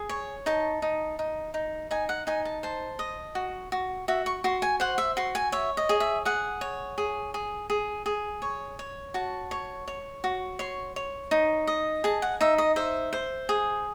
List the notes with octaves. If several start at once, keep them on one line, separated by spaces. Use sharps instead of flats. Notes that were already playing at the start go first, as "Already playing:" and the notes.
Already playing: G#4
C#5
D#4 A5
D#4
D#4
D#4
D#4 G#5
F#5
D#4 G#5
A5
C5 A5
D#5
F#4
F#4
F#4 E5
C#6
F#4 C6
G#5
C5 F#5
E5
F#4 C6
G#5
C#5 E5
D#5
G#4
E5
G#4 F#5
C#5
G#4
G#4
G#4
G#4
C#5
C#5
F#4 A5
C#5
C#5
F#4
C#5 C6
C#5
D#4
D#5
G#4 A5
F#5
D#4 E5
D#5
C5 E5
C5
G#4